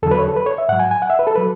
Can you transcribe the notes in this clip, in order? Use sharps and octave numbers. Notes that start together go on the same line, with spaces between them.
E2 D3 F#3 A4
B4
C#5
A4
B4
C#5
E5
G#2 F#3 F#5
G#5
G#5
F#5
E5
B4
A4
F#3 B4